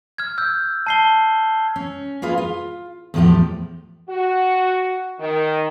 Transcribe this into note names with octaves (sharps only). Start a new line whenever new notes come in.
F6 G#6
E6 G6
A5 C7 G7
C#4
A#3 F4 G#4 B4 F5
F4
E2 A2 F3 A3 G4
F#4
D#3